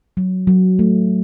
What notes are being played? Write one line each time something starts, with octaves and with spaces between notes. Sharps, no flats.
F#3
F#3
A3